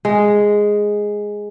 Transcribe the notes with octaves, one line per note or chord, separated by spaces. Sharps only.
G#3